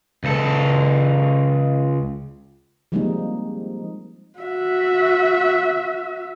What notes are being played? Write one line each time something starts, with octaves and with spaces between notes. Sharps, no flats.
C#2 A4
F3 G3 G#3 A#3 C4 D#4
F#4 E5